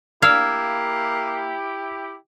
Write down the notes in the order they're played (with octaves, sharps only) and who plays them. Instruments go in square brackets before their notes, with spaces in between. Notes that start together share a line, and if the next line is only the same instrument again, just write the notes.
[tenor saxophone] A#3 [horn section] E4 G4 [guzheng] F5 [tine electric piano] E6 G#6